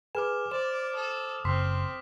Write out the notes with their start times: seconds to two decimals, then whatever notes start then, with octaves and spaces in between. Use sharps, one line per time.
0.15 G#4 B4 G#5 D6 F6 E7
0.52 C5 D5 E7
0.95 A4 D#6
1.45 F#1 C4 C6 F6 B6